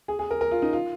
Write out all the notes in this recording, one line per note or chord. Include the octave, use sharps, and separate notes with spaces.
G#4
G#4
A#4
A#4
F4
D#4
F4